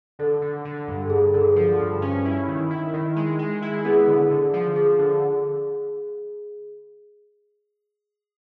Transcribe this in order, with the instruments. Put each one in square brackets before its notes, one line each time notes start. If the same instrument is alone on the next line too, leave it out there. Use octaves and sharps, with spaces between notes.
[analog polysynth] D3 [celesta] A4
[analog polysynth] D3
D3
G2
[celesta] A4
[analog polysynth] G2 [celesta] G#4
[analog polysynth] D3 [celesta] A4
[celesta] G#4
[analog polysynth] F3
[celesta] A4
[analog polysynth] G2
C#4
E4
D#3
E4
D#3
G#3
G#3
E4
[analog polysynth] B3 [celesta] G#4
[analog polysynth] D3
D3
F3
[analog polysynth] F3 [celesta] G#4
[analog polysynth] D3